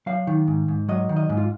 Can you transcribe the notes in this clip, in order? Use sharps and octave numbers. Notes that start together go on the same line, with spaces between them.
F#3 F5
D#3
G#2
G#2
F#3 D#5
D#3
D#5
G#2
F4